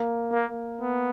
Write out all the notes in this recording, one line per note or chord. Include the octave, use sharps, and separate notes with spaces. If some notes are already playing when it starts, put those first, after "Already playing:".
Already playing: A#3
A#3
B3